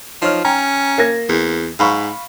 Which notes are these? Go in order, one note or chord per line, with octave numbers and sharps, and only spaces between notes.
F3 D#4 C#5 F6
C#4 G5 A#5
A#3 G#6 A#6
E2
G#2 F5 B5 C#6